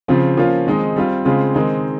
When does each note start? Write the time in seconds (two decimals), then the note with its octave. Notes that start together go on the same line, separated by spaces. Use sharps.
0.08 C#3 F3 C4 F4
0.37 F3 A#3 C#4 F4
0.67 D#3 G#3 C4 D#4
0.96 G3 C4 F4
1.25 C#3 G#3 C4 F4
1.54 D#3 G#3 C4 D#4